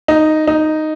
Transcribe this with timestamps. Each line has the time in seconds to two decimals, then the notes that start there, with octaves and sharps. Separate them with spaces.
0.08 D#4
0.47 D#4